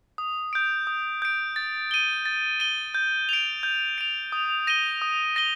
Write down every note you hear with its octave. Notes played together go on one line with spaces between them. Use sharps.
D#6
G6 D7
D#6
G6 D7
A6
D#7 G7
A6
D#7 G7
G6
D7 F7
G6
D7 F7
D#6
A#6 D#7 G7
D#6
A#6 D#7 G7